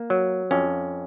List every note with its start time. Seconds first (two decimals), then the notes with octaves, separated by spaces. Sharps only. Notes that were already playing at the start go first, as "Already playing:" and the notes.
Already playing: A#3
0.10 F#3
0.51 F2 C#4